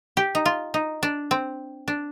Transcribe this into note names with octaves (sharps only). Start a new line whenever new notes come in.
G4
D#4
F4
D#4
D4
C4
D4